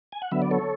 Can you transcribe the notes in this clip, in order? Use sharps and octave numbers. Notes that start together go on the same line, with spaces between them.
G#5
F#5
D3 F#3 B3 E5
D5
A4 C#5